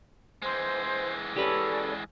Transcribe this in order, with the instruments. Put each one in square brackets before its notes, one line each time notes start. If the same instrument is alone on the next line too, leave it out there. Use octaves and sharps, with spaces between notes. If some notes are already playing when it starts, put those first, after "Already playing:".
[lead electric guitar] E3 G#3 [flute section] C5
[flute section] C#4 A4 D5 [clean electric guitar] G4 B4